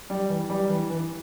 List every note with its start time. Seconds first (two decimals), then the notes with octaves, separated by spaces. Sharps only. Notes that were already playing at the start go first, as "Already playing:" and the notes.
0.10 G3
0.30 E3
0.50 G3
0.70 E3
0.90 E3